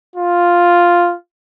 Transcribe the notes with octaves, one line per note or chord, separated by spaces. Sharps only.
F4